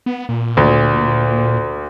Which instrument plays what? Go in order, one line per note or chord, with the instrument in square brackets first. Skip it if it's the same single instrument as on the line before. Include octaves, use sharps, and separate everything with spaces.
[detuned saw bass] B3
A#2
[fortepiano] D2